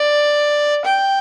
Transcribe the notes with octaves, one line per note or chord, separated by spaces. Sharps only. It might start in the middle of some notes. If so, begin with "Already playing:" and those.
Already playing: D5
G5